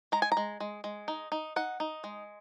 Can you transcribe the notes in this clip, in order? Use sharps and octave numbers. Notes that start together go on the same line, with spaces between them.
G#3 A#5
G#5
A#5
G#3
G#3
G#3
D#4
D#4
D#4 F#5
D#4
G#3